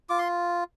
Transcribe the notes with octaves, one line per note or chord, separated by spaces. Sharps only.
F4 D6
C6